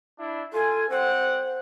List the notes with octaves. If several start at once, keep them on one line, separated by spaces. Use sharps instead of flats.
D4 E4
F4 A4 G#5
G3 C4 C5 F#5